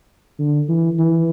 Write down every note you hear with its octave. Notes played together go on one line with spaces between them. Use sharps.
D3
E3
E3